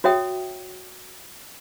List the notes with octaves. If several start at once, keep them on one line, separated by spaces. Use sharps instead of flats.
F#4 C#5 E5 G5 D#6